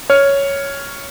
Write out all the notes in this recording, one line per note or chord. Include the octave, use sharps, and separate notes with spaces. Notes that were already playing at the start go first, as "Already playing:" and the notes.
C#5 F6